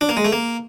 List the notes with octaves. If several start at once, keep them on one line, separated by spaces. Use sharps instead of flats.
D4
A#3
G#3
A3
A#3